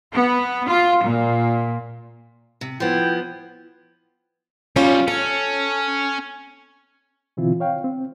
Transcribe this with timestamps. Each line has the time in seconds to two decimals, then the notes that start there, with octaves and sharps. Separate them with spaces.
0.12 B3
0.67 F4
1.03 A#2
2.61 C3
2.80 F3 B3 E4 G5
4.76 B1 G3 C#4 F4
5.08 C#4 A4
7.37 B2 D3 E3 C4 E4 F4
7.60 C#5 F5 G5
7.84 C4